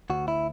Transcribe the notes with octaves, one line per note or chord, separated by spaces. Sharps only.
D2 F#4
E4